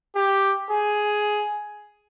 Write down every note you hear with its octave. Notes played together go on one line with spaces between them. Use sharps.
G4
G#4